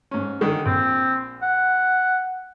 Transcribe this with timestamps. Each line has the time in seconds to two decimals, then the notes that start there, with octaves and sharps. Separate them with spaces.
0.11 G#2 C#4
0.41 D3 D#3 G#3
0.66 A#1 C4
1.42 F#5